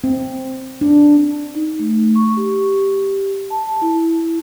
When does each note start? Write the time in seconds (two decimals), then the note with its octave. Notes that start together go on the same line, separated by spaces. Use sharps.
0.04 C4
0.81 D4
1.55 D#4
1.79 A3
2.15 C#6
2.37 G4
3.50 A5
3.82 E4
4.20 E4